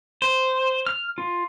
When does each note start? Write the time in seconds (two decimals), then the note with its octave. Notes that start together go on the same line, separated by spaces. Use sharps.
0.22 C5
0.87 F6
1.18 F4